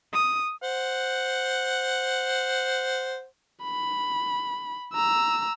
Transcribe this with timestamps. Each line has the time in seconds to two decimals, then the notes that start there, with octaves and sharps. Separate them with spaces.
0.13 D#6
0.62 C5 F#5
3.63 B5
4.94 A#5 E6